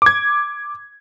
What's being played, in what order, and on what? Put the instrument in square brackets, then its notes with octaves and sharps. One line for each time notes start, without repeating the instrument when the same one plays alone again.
[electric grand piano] D6 G#6